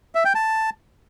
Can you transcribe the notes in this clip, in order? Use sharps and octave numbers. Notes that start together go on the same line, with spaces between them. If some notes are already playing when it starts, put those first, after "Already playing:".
E5
G5
A5